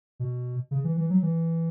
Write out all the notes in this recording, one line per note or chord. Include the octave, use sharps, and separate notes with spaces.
B2
C#3
E3
E3
F#3
E3